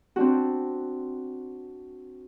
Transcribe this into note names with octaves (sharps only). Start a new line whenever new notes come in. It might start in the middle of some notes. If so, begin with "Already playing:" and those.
C4 D4 F#4